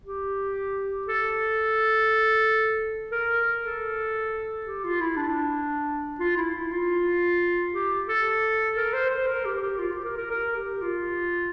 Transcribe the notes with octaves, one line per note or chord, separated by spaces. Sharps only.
G4
A4
A#4
A4
G4
F4
E4
D4
F4
E4
E4
F4
G4
A4
A#4
C5
C5
A#4
G4
G4
F4
G4
A#4
A#4
A#4
G4
F4